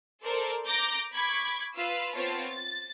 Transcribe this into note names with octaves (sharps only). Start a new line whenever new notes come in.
A4 A#4 C5 D5
A#5 D6 G6 A#6
B5 C#6 D6 G#6
F4 B4 F5 E6
B3 C4 F4 C#5 A5
A6